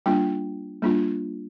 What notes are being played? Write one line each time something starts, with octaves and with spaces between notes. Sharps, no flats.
G3 A#3 D4 F4 G5
G3 A#3 D4 F4